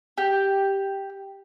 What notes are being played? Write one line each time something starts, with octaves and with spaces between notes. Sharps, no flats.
G4